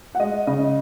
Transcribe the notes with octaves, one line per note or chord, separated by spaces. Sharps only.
F#5
G#3 D#5
C#3 D#5